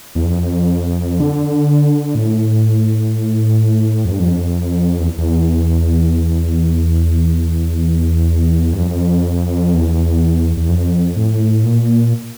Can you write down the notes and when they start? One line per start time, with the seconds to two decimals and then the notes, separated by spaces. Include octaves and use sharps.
0.15 E2
0.25 F2
1.20 D3
2.15 A2
4.05 F2
4.11 G2
4.19 F2
5.00 E2
5.18 E2
8.73 G2
8.79 F2
9.74 E2
10.57 E2
10.69 F2
11.17 A2
11.64 A#2